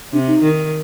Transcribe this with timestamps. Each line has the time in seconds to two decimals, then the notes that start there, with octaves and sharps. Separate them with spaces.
0.13 C3 D4
0.27 D#4
0.42 D#3